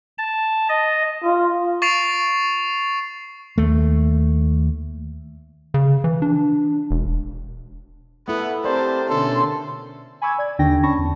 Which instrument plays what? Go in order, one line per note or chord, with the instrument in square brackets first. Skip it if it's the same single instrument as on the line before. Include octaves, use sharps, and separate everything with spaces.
[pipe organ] A5
D#5
[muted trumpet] F4
[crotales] C#6 A6 C7 D7 F7
[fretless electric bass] D#2 A3
[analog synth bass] C#3
E3
D4
E1
[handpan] A3 E4 A4 [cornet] B3 [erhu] F#5
[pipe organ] C4 G4 [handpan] A#4 D5 [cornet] C5 [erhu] A5
[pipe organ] B2 D3 C#4 [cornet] A4 [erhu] C6
[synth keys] G#5 B5 C#6 D6 E6 G#6
D5 G#6
D#2 D3 D4 G5 A#6
C#4 A5 B5 C#6 A#6
E2